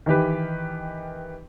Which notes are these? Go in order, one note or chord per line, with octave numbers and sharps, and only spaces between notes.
D#3 E3 G4 B4